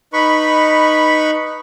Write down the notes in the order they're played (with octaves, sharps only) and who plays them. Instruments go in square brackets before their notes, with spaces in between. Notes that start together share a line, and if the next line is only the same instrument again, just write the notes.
[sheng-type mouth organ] D#4 B4 B5 C#6